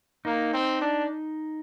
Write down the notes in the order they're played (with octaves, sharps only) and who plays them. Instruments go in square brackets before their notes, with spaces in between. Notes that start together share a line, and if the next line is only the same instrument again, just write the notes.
[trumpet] A#3 [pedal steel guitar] D#4
[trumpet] C4
D4